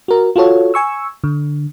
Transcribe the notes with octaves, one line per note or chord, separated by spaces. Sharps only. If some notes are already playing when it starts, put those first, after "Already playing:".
F#4 A#4
F4 F#4 A4 C#5
G#5 C#6 E6
D3